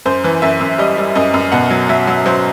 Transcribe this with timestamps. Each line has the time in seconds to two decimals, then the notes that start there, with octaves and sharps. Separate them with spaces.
0.06 F#2 C5
0.24 E3
0.42 F#2 E5
0.61 F#2
0.78 G3 D#5
0.97 G3
1.15 F#2 D#5
1.34 F#2
1.52 B2 F#5
1.70 F#3
1.89 F#3 E5
2.07 F#3
2.26 F#3 C5